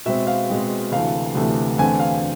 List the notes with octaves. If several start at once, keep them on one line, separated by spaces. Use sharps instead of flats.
B2 G#3 C4 E5
F5
B2 G#3 C4
D2 C3 E3 A3 F5
D2 C3 E3 A3
E2 D3 A3 C4 G#5
F5